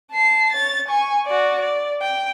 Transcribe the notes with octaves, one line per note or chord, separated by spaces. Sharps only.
A5 C7
C#5 A6
G#5 C#6
F#4 D5
D5
G5